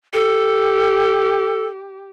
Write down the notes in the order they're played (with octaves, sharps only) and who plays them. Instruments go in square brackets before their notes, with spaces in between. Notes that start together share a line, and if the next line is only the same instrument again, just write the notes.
[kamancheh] G4 [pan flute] A4